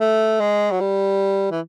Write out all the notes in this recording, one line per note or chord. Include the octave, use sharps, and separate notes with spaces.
A3
G#3
F#3
G3
E3